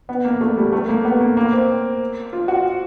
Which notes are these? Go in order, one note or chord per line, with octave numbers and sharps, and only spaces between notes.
B3
A#3
A3
G3
A3
A#3
B3
A#3
A#3
C4
F4
F#4